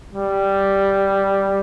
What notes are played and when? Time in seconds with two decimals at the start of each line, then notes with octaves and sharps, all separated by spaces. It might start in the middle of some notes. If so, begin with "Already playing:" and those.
0.13 G3